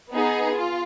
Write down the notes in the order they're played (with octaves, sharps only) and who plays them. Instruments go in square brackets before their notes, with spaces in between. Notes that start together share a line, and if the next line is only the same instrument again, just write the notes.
[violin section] B3 D#4 G#4
F4